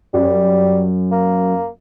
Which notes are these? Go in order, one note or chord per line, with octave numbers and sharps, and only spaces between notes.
F#2 G3
A#3